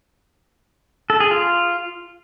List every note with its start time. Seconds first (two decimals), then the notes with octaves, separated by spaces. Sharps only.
1.10 A4
1.20 G#4
1.31 F4